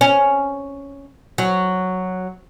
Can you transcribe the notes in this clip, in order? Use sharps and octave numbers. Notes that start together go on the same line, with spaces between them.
C#4
F#3